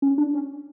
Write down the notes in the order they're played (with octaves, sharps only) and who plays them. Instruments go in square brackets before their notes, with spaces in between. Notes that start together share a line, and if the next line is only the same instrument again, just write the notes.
[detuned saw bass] C#4
D4
C#4